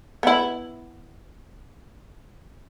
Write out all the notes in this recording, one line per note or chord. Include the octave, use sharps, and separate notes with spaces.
B3 E4